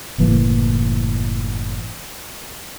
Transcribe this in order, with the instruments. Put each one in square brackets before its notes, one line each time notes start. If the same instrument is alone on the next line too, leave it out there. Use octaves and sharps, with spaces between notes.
[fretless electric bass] F#1 A2 E3 A#3